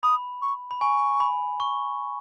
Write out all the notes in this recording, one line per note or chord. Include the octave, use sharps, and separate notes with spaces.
B5 D#6
C#6
B5
G#5 C#6
B5
C#6